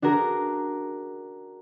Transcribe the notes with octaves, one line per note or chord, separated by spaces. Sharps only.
D4 F#4 G#4 A#4